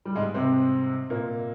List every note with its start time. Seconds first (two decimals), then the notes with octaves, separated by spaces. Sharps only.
0.05 G3
0.15 G#2 G#3
0.34 C3 C4
1.10 A#2 A#3